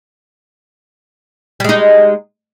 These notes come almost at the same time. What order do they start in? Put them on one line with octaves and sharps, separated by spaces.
G3 G#3 D#4